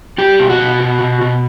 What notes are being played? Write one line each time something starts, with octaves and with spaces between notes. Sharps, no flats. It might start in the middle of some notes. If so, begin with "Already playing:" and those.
G3 G4
B2
F#4
B2
B2
B2
B2